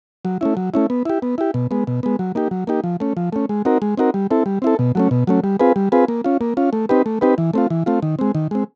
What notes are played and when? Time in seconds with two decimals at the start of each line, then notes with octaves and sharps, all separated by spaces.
0.25 F#3
0.41 A3 C#4 E4
0.57 F#3
0.74 A3 C#4 E4
0.90 B3
1.05 E4 G4
1.22 B3
1.38 E4 G4
1.54 B2
1.71 G#3 B3
1.87 B2
2.03 G#3 B3
2.19 F#3
2.35 A#3 D#4 G4
2.51 F#3
2.67 A#3 D#4 G4
2.84 F3
3.00 A3 C#4
3.17 F3
3.32 A3 C#4
3.49 G#3
3.65 C4 D#4 F#4 A#4
3.82 G#3
3.97 C4 D#4 F#4 A#4
4.14 G3
4.31 C4 E4 A4
4.46 G3
4.62 C4 E4 A4
4.79 B2
4.95 F#3 A3 C#4
5.11 B2
5.27 F#3 A3 C#4
5.44 G3
5.60 C4 F4 G#4 B4
5.76 G3
5.92 C4 F4 G#4 B4
6.08 A#3
6.24 C#4 F4
6.41 A#3
6.57 C#4 F4
6.73 A3
6.89 C4 D#4 G4 B4
7.06 A3
7.21 C4 D#4 G4 B4
7.38 E3
7.53 A3 C4 F4
7.70 E3
7.86 A3 C4 F4
8.02 D#3
8.19 G#3 C4
8.35 D#3
8.51 G#3 C4